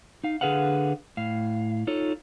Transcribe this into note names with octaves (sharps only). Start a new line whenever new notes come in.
D#4 F5
D3 G#4 B4 F5 F#5
A2 F5
D#4 F4 A4 C#5